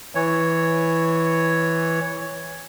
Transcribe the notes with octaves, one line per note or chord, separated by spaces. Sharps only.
E3 C#5